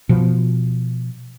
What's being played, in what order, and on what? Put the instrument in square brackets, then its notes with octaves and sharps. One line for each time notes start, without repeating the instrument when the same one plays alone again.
[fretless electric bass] B2 F3